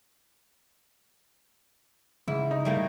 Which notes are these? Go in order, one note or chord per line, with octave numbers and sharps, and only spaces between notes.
G#2 C#3 E4
D#4
G3 A3 A#3